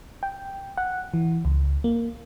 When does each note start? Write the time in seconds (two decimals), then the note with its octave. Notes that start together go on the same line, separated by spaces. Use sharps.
0.23 G5
0.78 F#5
1.14 E3
1.45 C#2
1.84 A#3